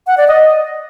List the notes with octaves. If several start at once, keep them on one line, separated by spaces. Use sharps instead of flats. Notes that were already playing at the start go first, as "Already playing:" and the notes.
F#5
D5
D#5